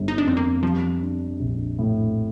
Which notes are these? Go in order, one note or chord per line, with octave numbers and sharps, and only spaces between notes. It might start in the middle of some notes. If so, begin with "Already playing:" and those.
Already playing: G1
D#4
D4
F2 C4
A#3
F3 G3
D4
A#1
A2